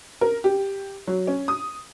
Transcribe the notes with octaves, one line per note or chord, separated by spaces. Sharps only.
A#4
G4
F#3
C#4
D#6